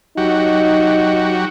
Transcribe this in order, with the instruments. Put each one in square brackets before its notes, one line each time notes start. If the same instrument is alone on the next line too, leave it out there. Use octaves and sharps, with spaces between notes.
[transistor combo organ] F#3 F#4 G4 [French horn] D#4